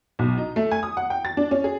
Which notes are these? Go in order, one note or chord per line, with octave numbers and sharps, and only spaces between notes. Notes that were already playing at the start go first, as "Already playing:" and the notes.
B1
D#4
A3
G#5
D#6
F#5
G5
A6
D4
C#4
G#4